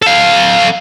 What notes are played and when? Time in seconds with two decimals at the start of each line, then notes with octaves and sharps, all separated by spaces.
0.02 A4 F5